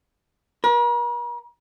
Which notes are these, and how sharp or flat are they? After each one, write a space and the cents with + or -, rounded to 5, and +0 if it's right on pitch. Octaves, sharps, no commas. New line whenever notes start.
A#4 +45